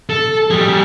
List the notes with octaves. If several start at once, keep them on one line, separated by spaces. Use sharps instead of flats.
A4
G3 G#4